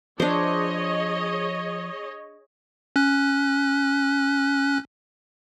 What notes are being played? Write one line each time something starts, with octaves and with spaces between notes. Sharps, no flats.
F3 D4 G#4 C5 C#5 D#5
C#4 F#6